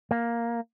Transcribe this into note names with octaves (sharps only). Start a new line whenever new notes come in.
A#3